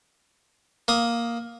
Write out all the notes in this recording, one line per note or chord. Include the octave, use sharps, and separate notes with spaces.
A#3 D#6